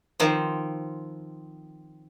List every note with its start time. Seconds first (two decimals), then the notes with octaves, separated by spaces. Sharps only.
0.20 D#3 F3 C4